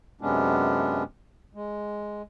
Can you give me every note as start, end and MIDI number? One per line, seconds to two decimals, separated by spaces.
0.21 1.03 42
0.21 1.03 48
0.21 1.03 56
0.21 1.03 59
0.21 1.03 61
0.21 1.03 62
1.54 2.22 56